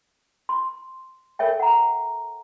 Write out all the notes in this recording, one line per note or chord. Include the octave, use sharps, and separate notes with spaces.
C6
A4 A#4 C#5 E5 G5
F#5 A#5